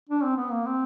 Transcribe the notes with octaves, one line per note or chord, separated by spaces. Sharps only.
D4
C4
B3
A#3
C4